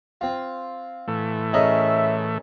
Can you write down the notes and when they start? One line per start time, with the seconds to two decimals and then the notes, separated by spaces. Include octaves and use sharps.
0.21 C4 F4
1.08 A2 E3 A3
1.54 C#4 G#4 A#4 D#5 E5